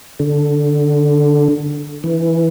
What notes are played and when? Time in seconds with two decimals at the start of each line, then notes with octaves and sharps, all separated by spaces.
0.20 D3
2.04 E3